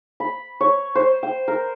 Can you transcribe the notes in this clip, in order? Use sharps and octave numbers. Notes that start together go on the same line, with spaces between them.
B5
C#5
C5
G5
A#4